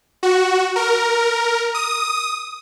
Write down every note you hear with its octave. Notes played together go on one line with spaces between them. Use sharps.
F#4
A#4
D#6